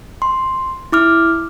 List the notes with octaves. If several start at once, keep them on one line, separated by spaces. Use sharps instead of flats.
C6
E4 D6 F6